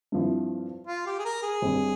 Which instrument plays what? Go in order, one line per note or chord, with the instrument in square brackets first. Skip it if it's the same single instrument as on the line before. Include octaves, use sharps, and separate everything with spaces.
[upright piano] G2 F3 C4 E4
[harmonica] F4
G4
G#4
A#4
G#4
[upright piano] G1 G2 G3 C4